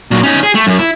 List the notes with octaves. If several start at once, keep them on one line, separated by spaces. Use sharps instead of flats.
A#2 F#3
C#4 D#4
G#4
A3
F#2
E4